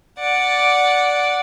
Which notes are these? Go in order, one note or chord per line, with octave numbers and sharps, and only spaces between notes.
D5 F#5